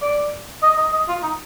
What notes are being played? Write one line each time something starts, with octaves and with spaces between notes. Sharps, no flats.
D5
D#5
D#5
D#5
F4
D#4